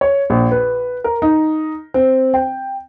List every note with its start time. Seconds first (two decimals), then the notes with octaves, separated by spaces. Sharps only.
0.01 C#5
0.30 A#1
0.51 B4
1.04 A#4
1.22 D#4
1.94 C4
2.34 G5